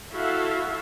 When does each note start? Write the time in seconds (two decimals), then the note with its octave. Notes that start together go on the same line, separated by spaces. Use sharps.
0.12 E4 F#4 A4 E5 F5